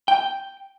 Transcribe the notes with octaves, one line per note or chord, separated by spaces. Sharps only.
G5